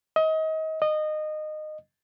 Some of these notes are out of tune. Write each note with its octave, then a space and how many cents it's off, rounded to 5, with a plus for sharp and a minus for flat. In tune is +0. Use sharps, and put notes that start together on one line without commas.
D#5 +30
D#5 -20